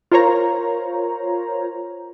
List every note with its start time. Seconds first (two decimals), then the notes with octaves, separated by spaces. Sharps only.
0.12 F4 A#4 C5 C#5 A#5